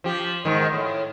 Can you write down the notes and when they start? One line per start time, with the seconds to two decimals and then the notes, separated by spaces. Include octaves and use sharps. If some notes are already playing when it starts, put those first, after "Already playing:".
0.04 F3 G4
0.45 G#2 D#3
0.73 A2